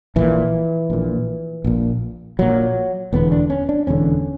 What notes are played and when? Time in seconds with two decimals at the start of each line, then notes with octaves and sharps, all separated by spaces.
0.16 A#1 A#2 E3
0.90 A#1 A#2
1.64 A#1 A#2
2.39 A#1 A#2 F#3
3.13 E1 E2 D3 B3
3.32 D4
3.50 C#4
3.69 D4
3.87 E1 E2 D3 C#4